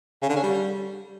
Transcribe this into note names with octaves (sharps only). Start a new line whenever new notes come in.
C#3
D3
C#4
G3